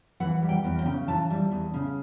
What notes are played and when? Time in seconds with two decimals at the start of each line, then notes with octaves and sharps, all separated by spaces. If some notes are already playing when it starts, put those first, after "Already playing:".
0.20 E3 F#5
0.42 G3
0.49 G5
0.64 E2
0.79 G5
0.85 C#3
1.08 E3 A5
1.30 G3
1.51 E2
1.74 C#3